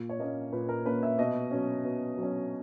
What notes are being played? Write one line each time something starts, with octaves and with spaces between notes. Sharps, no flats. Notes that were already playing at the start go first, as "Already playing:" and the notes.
Already playing: A#2
C#5
A#3 C#4 D#5
A#2 B4
A#4
A#3 C#4 B4
E5
B2 D#5
F#3 C#4
B2
F#3
C#4